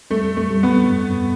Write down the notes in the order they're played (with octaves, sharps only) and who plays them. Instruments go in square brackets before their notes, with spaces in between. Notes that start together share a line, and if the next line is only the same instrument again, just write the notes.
[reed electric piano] G3 [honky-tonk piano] A3
[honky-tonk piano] A3
[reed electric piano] G3
[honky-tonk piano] B3
[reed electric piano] G2